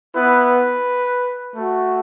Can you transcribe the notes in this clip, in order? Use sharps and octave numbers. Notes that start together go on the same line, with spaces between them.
B3 E4 B4
A3 F#4